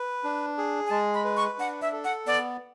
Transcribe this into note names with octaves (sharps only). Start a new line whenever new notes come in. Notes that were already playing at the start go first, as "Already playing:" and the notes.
Already playing: B4
D4
G#4
G#5
G#3 A5
B5
B4
C#6
D4 F#5
E5
A4
F#5
B3 D5